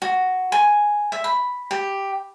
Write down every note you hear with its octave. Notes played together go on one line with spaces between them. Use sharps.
F#4
G#5
E5
B5
G4